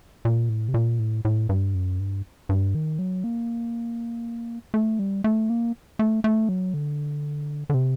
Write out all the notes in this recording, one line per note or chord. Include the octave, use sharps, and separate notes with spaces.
A#2
A2
C3
A#2
A2
A2
G2
F#2
G2
G2
D#3
F#3
A#3
A3
G3
A3
A#3
A3
A3
F#3
D3
D3
C3